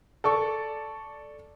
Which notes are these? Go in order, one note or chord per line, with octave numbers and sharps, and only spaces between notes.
A4 D5 C#6